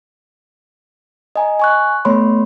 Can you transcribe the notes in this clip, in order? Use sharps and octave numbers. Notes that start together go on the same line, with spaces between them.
D#5 G#5 A#5
G#5 C#6 F#6
A3 B3 C#5 B5 C6